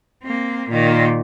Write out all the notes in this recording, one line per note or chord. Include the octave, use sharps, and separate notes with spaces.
A#3 C4
A#2 D#3